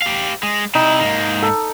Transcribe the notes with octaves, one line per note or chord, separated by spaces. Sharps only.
G4 F5
G#3
C3 D#4 E4
G#2 A#3
A4